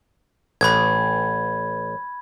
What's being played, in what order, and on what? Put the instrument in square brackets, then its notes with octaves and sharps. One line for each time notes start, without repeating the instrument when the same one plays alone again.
[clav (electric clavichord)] A1 [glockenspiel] B5 G#6